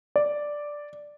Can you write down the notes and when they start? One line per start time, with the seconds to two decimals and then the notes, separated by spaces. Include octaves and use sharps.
0.16 D5